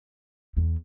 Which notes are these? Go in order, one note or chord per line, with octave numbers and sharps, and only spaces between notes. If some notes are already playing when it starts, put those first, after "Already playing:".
E2